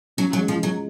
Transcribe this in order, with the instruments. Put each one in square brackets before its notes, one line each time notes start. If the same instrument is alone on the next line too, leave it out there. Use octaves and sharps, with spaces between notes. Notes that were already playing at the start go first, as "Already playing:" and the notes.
[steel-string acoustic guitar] F#3 [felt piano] C#4
[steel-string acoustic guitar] F#3
[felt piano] G#3
[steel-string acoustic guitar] F3
[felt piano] F3 [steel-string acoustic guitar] F#3